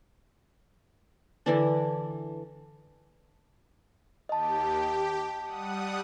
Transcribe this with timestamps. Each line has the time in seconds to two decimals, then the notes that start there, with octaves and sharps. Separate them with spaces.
1.46 D3 E3 D4
4.29 D#2 G4 D#5 A5
4.79 G4
5.43 G3 F#5 D#6